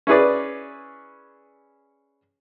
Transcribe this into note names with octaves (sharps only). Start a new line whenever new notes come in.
C#4 E4 G#4 B4 D5